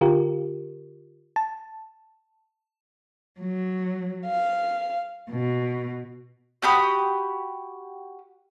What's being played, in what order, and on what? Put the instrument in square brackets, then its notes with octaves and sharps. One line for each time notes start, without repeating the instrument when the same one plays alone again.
[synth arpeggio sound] D3 F4 G4 A#4
A5
[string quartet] F#3
F5
B2
[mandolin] F#4 G4 B5 D#6